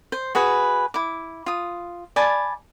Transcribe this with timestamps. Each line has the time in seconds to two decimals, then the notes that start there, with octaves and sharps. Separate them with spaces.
0.12 C5
0.35 F#4 G#4 B4
0.94 E4 D6
1.46 F4 D#6
2.16 D5 G#5 A5 B5